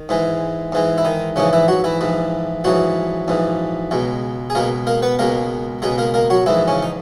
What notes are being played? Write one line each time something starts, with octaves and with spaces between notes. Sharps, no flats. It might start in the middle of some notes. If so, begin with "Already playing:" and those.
Already playing: D#3
G#2 E3 G#3
G#2 E3 G#3
E4
D#3 D#4
A#1 G#2 C#3 E3 C#4
E3 E4
F#3 F#4
E3 E4
A#1 G#2 E3
A#1 G#2 E3 F#3 F#4
A#1 G#2 E3
C#2 B2 G#3
G#4
C#2 B2 G#3 A#3 A#4
A#3 A#4
B3 B4
C#2 B2 G#3 A#3 A#4
C#2 B2 G#3 G#4
A#3 A#4
A#3 A#4
F#3 F#4
A#1 G#2 E3 G#3 E4
C#3 C#4
D#4